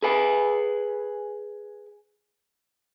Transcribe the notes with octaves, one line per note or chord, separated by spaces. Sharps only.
G#4 B4 G#5